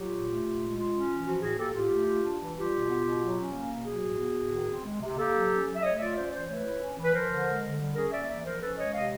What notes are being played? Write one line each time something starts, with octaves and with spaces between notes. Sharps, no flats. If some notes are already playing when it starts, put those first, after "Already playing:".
Already playing: F#3 F4 G4
A#2
A3
A#2
G#3
F4
C#4
E3
F3 F#4
A2 F#4 G#4
A#3 G4 A4
A2 F4 G4
A3
F4
D4
E3
G3 F4 G4
B2
B3
B2
F#3
C#4
A#3
B2
F#3 F#4 G#4
A2
B3
A2
D#3
C4
G#3
C3
A#3 G4 A4
F#3
C#4
F#3
E5
A3 C#5 D#5
F4 D5 E5
C#4 C5 D5
E3 C5 D5
A3 B4 C#5
E4
C#4
E3
B4
F3 A#4 C5
D3
G#3
D3
G3
C#4 G#4 A#4
A#3 D5 E5
E3 D5 E5
F3 A#4 C5
C#4 A4 B4
G#3 C#5 D#5
C3 D#5 F5